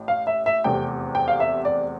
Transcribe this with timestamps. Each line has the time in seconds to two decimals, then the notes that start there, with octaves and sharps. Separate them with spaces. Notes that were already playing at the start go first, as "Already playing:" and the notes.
Already playing: A1 A2
0.08 F5
0.27 E5
0.46 E5
0.64 F1 E2 C3 G5
1.15 G5
1.28 F5
1.40 E5
1.65 D5